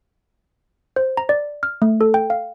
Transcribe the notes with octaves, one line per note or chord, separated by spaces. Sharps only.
C5
A#5
D5
F6
A3
A4
G5
F5